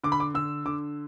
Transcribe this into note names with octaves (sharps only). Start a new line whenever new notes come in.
D3 D6
B5
D6
D3 E6
D3 D6